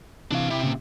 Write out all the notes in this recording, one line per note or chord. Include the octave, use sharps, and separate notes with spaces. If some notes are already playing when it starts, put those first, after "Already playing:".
C3 E3 D4 F5
C3 E4
A#2 C#3